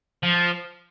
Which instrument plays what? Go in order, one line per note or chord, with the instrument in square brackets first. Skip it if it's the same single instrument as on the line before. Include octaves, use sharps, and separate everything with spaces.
[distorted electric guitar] F3